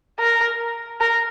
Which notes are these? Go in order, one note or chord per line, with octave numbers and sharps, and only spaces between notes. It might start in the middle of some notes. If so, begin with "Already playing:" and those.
A#4
A#4